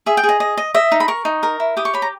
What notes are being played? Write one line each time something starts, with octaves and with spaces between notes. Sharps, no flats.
G#4 E5
G5
G#4
D#5
D#5
D#5
D#5 E5
D#4
B5
A#4 C#6
D#4
A#4
E4
G4 D#6
C#6
C#5 B5
A#5